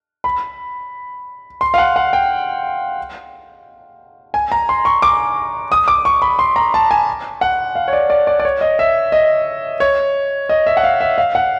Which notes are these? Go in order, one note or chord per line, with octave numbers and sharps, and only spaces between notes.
B5
C6
F5
F#5
F#5
G5
G#5
A#5
C6
C#6
D6
D#6
D6
C#6
B5
C6
A#5
A5
G#5
F#5
F5
C#5
D5
D5
D5
D5
C#5
D#5
E5
D#5
C#5
D#5
E5
F#5
F5
E5
F5
F#5